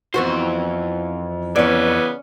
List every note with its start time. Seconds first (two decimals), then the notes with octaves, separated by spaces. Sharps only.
0.14 F2 E3 B3 F#4 C5
1.56 C#3 E3 B3 C#4 D5